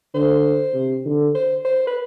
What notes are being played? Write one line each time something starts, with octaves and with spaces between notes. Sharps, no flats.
D3 C5
C3
D3
C5
C5
B4